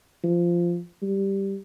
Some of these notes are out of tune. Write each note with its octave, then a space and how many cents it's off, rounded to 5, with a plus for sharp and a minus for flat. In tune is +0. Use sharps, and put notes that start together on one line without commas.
F3 -10
G3 +0